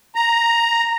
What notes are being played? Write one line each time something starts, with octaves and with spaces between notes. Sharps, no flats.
A#5